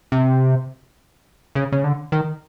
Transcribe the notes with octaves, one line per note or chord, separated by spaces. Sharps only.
C3
C#3
C#3
D3
D#3